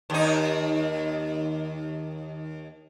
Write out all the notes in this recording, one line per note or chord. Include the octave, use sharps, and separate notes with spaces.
D#2 D#4